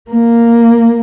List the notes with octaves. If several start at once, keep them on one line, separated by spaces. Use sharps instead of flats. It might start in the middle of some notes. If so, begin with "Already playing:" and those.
A#3